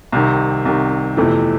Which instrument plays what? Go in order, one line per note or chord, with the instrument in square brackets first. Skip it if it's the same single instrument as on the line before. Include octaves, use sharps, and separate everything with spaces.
[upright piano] C2 C3 D#3
C2 C3 D#3
G1 F2 C3 E3 A3